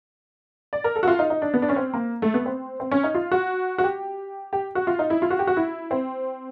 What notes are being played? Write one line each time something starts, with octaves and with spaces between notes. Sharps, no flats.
D5
A#4
A4
F#4
F4
D#4
D#4
D4
B3
D4
C#4
C4
A#3
A3
B3
C4
C4
C#4
D#4
F4
F#4
F#4
G4
G4
F#4
F4
D#4
E4
F4
F#4
G4
F#4
E4
C4